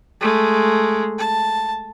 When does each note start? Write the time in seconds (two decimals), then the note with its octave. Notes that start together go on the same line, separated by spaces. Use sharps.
0.21 G#3 A3
1.18 A5